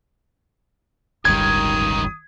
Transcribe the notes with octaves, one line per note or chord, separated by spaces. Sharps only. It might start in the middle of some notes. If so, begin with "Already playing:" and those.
D1 G1 C#2 D#3 G3 D#6 G#6